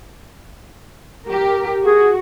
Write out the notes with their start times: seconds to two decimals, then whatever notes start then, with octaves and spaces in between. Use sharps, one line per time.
1.26 G4 A#4
1.84 F#4 G#4